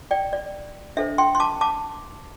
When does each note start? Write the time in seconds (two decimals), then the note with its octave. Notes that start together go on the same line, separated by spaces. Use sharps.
0.11 D5 G5
0.33 D5
0.97 D4 A4 C5 E5
1.18 G5 C6
1.35 C6
1.40 A5 D6
1.61 A5 D6